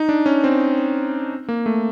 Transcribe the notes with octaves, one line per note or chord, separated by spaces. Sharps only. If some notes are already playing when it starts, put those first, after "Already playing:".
Already playing: D#4
D4
C#4
C4
A#3
A3